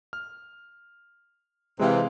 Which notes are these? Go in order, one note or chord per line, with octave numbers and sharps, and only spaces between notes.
F6
C3 E3 G#3 F5